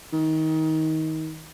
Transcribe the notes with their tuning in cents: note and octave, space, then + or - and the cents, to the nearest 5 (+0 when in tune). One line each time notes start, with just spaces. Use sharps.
D#3 +25